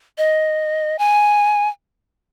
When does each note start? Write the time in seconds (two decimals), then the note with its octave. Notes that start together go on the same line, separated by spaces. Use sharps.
0.18 D#5
0.99 G#5